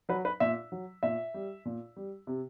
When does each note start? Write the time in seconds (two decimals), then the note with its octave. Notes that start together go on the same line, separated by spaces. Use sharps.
0.09 F#3 B4
0.25 B4
0.40 A#2 E5
0.72 F#3
1.03 A#2 E5
1.34 G3
1.65 A#2
1.96 G3
2.27 C3